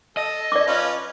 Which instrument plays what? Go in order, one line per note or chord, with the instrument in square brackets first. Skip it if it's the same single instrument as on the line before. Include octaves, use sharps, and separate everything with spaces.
[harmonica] A4 [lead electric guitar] D#5
[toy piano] D5 D6
[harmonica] C#4 F4 B4